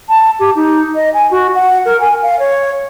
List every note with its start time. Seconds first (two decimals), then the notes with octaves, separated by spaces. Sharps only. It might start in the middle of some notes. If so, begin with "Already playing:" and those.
0.09 A5
0.39 G4
0.55 D#4
0.95 D#5
1.14 G#5
1.31 F#4
1.55 F#5
1.85 A#4
2.01 G#5
2.23 F5
2.39 C#5